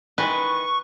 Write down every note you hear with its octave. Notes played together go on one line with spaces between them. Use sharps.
D#3 E3 G#3 B4 C#6